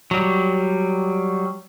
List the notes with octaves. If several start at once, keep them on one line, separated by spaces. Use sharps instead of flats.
F#3 G3